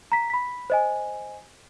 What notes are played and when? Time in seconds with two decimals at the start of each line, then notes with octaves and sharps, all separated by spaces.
0.12 A#5 B6
0.30 B5 B6
0.70 C5 D#5 G#5